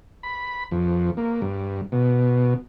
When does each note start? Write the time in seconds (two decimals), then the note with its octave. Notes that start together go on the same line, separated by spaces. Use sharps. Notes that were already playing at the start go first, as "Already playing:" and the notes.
0.23 B5
0.71 F2
1.17 A#3
1.42 G2
1.92 B2